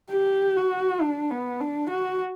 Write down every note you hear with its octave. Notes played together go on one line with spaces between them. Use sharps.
G4
F#4
D4
B3
D4
F#4